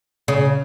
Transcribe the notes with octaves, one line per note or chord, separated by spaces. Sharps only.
C#3